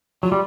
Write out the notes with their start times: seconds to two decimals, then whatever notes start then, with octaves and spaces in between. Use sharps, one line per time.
0.23 F#3 F4
0.32 G3